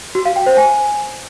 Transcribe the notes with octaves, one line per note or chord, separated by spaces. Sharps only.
F#4
F5
G5
C5
G#5